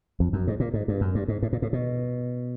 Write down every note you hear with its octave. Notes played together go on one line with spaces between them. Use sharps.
F2
F#2
G#2
A#2
G#2
G2
F#2
G2
G#2
A2
A#2
A2
B2